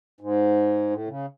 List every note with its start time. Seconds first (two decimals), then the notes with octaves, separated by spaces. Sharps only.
0.21 G#2
0.90 A2
1.08 C#3